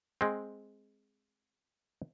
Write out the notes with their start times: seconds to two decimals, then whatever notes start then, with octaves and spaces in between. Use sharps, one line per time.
0.21 G#3 C4